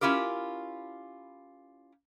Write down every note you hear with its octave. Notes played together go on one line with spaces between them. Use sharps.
C#4 E4 F4 G4 A#4